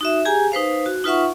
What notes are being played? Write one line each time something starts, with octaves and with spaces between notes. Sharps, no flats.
D#4 F#4 E5
G4 G#4 G#5 A#5
D#4 B4 C5 F5
F#4
D#4 F4 B4 E5 F#5 C#6